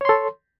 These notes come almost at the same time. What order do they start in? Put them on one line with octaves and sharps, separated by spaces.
C#5 C6 A4